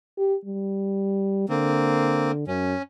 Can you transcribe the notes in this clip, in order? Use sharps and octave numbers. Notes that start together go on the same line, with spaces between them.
G4
G3
D3 A#3 C4
F#2 C#4